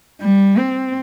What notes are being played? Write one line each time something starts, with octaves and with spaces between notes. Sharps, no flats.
G3
C4